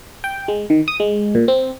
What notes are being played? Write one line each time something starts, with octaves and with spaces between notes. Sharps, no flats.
G5
G#3
D#3
D#6
G#3
A#2
C4